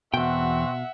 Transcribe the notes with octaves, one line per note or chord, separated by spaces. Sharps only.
E2 B2 C4 F#4 E5 F#5 G5